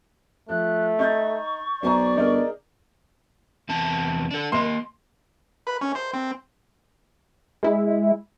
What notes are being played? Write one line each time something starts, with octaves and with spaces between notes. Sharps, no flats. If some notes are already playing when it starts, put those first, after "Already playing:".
F3 A3 F#6
D#4 C#6 G6 A6
B1 C5 D5 G#5 A#5
G1 D#4 G#4 A#4
E2 C3 A5
D4 A4
A#3 D#5 C6
B4
C#4
C5
C4
G#3 E4